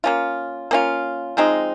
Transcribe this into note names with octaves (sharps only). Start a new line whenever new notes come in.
A#3 C#4 F4
A#3 C#4 F4
F3 G#3 C4 D#4